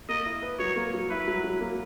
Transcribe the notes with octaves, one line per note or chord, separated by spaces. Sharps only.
A#3 D#5
E4
B4
F#3 C#5
A#3
F#3
E4 B4
F#3
F#3
A#3